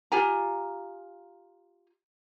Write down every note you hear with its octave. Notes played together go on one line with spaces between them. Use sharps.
F4 G4 G#5 A#5